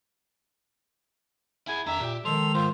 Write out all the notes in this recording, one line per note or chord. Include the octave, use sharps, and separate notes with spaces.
E4 G#4 G#5
F2 D#3 D4 E5 A#5
A#2 G4
D#3 F3 G#3 A4 C6 F7
D2 G#2 F4 C5